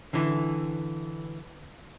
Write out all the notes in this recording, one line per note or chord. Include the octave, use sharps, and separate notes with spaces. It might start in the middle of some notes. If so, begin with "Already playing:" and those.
D3 E3